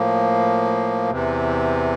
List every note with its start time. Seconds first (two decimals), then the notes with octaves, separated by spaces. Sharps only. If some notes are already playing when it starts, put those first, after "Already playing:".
Already playing: A2 F3 A#3
1.10 E2 C3 E3